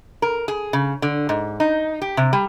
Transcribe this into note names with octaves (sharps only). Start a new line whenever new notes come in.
A#4
G#4
C#3
D3
G#2
D#4
G4
C3
G3